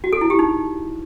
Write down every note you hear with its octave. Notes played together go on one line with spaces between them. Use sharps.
F#4
A4
E4
G4
D#4